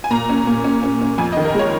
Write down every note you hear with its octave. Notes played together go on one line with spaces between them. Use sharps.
G#5
A#2 A#5
C#4
A#2
C#4
C#4
C#4
F2 G#5
D#5
D#3
A#4
G#3 C#5